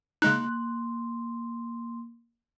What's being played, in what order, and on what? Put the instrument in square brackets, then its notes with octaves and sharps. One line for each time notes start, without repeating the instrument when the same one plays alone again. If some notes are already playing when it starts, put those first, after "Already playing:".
[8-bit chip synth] C#3 G#3 D#4 [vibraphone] A#3 C6 [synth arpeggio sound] F#6